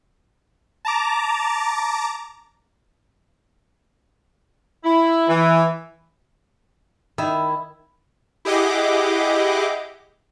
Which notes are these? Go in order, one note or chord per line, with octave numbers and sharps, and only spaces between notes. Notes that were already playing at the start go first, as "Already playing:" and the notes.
A5 A#5 D6
E4
E3
D#3 E4
E4 G4 G#4 D#5 F#5 D6